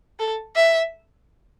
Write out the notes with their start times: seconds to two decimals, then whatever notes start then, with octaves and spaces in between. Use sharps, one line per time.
0.19 A4
0.56 E5